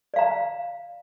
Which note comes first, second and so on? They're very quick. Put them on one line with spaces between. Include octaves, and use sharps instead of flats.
D5 F5 A#5